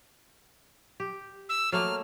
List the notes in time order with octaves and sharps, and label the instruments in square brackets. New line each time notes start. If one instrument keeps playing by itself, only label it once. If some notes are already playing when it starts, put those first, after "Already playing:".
[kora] G4
[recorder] E6
[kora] F#3 A3 A#3 [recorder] F6